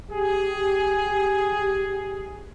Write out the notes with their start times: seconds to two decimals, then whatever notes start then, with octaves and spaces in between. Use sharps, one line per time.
0.11 G4 G#4